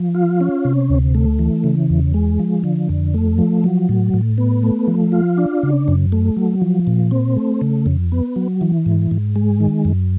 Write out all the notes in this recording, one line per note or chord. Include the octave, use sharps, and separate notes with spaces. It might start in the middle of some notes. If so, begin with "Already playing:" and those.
Already playing: F3
F4
C#4
C3
D2
A3
E3
C#3
E2
G#3
F3
D3
F2
A3
F3
F#3
A2
A2
B3
A3
F3
F4
D4
C#3
F#2
A3
F#3
F3
A#2
C4
A3
C#3
F2
B3
F#3
E3
G#2
G#2
G#3
D#3
F#2